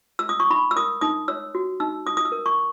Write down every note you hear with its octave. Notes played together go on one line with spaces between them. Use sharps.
E6
D#6
C#6
D#4 B5
E6
A#4 D#6
D#4 D#6
C#5 E6
F#4
D#4 E6
D#4 D#6
D#6
E6
A#4
C#6